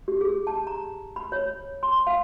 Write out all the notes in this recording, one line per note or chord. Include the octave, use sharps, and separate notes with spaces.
G4
G#4
A5
A#5
B5
C#5
C6
F5